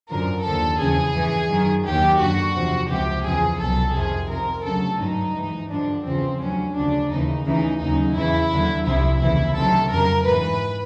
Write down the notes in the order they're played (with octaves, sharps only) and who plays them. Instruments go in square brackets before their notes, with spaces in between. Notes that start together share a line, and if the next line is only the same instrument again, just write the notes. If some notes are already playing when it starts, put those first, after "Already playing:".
[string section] F#2 D3 F3 A#4
D#2 D3 F3 A4
E2 C#3 F3 G#4
G2 E3
F#2 D#3 F#3
D#2 D#3 F#3 G4
F#2 D3 F#3 F#4
E2 C3 F3
C#2 C3 F3 G4
E2 C#3 F3 G#4
C2 B2 F#3 A4
F2 C3 D#3 G#4
F2 C3 F3 A#4
D2 C#3 F#3 A4
G2 D#3 F#3 D#4
G#2 E3
G2 D3 F3 D4
E2 C#3 F3 C4
D2 D3 F#3 C#4
D2 C#3 F3 D4
D#2 C#3 E3 D#4
D2 C#3 E3 D#4
D#2 C#3 F#3 D#4
E2 C#3 E3 E4
D#2 D3 F#3
C2 C3 F3 E4
D#2 C#3 E3 E4
D2 C3 D#3 F#3 A4
F2 C#3 F#3 A#4
G#2 E3 B4